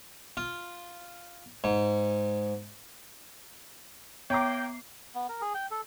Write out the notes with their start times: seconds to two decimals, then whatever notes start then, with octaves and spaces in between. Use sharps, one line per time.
0.37 F4
1.64 G#2
4.30 A#3 B3 C#5 G5 A#5 D6 C7
5.15 B3
5.29 A#4
5.41 G#4
5.54 G5
5.71 A4